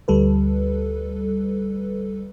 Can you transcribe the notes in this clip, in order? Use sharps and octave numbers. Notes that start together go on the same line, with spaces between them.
D2 G3 A4 B4